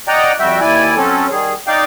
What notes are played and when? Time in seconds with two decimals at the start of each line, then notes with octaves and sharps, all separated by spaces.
0.08 D5 D#5 F#5 G5 A#5
0.39 F2 G3 F#4 E5 G5
0.61 D#2 E4 D5 G#5
0.96 F#3 C4 C#4 A4
1.31 D#3 G3 G#4
1.67 D#4 D5 F5 G5